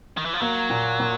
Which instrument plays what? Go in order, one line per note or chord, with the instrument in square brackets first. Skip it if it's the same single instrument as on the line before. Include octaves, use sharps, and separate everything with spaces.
[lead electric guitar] D#3
E3
F3
[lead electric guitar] F#3 [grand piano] A#3
[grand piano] A#2
A#2